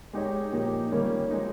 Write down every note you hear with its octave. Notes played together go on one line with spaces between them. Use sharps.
G#3 D#4 G4 C#5
A#2 F3 A#3 D#4 G4
D#3 G3 A#3 C#4
F3 G#3 D#4